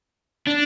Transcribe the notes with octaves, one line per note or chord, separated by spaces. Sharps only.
D4